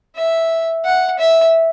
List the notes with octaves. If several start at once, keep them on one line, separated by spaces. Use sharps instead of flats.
E5
F#5
E5